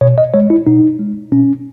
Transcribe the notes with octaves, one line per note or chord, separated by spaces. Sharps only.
B2 C#5
D#5
G#3 C#5
E4
B2 D#4
G#3
B2 C#4